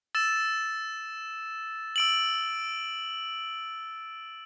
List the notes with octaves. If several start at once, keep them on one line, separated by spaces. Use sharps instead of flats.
E6 A6 E7
E6 D7 F#7